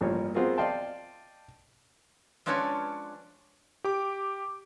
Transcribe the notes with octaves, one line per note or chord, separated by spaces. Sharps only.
A1 G2 F3 A#3 C#5
B3 C4 F4 F#4 G#4 A#4
D5 D#5 F5 G5 A5 C6
F3 G#3 C#4 D4 B4 C#5
G4 D6